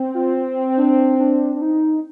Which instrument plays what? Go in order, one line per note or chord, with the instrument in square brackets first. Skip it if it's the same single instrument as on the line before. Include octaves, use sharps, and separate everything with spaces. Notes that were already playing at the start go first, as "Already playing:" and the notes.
Already playing: [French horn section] C4
[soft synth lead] F4
D4
D4
D4
D#4